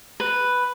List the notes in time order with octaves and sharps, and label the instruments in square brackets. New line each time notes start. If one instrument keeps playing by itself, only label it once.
[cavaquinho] B4